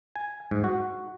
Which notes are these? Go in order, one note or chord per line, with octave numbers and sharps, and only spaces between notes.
G#5
G#2
F#4